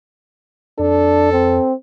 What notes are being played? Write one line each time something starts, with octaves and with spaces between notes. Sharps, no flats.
F2 D4 A4
C4